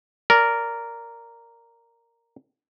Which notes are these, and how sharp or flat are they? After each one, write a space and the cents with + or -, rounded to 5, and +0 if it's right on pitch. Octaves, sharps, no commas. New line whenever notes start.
A#4 -5 D5 -20